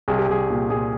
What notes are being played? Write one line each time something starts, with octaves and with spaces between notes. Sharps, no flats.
C2 G#4
G4
C2 G#4
A#2
A#2 G#4